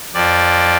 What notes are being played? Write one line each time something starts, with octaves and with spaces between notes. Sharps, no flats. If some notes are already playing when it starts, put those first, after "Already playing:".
F2 F3 D5